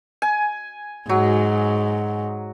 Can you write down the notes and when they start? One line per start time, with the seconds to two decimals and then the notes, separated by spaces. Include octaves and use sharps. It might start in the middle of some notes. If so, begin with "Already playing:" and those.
0.22 G#5
1.09 G#2 F#3